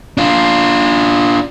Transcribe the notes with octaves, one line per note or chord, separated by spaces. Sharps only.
D4 F4